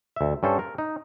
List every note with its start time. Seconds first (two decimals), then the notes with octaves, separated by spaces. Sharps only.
0.16 D2 E5
0.43 G2 C#4 A4 C5
0.59 A#4
0.78 D#4